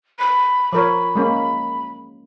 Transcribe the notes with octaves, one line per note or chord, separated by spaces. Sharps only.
B5
F3 A#4 C#5 B5
G#3 A#3 C#4